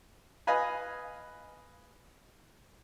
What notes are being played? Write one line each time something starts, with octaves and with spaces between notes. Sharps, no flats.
B4 D#5 F5 G#5 B5